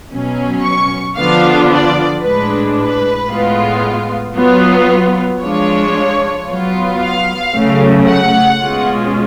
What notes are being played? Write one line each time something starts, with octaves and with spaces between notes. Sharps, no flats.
B2 F#3 C#4
C#6
D3 F3 B3 D4 F4 F5
D5
A2 G#3 D4 B4
B4
A2 G#3 B3 F4
F#3 B3 F4
F3 G#3 D4 F4 C#5
F#3 B3 F4
F5
C#3 F#3 A3
F#5
B2 G#3 C#4 F4